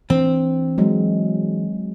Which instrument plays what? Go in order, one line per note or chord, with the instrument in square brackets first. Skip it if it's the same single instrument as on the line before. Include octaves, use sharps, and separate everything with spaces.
[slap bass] E3 D4 [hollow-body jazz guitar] C4
[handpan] F#3 G#3